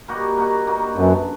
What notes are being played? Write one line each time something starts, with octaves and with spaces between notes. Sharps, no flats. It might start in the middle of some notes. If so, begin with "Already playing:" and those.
G3 A#3 D#4 F#4
G3 A#3 D#4 F#4
G3 A#3 D#4 F#4
F#2 D3 F#3 B3